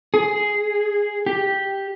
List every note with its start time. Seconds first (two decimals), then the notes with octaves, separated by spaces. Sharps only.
0.14 G#4
1.26 G4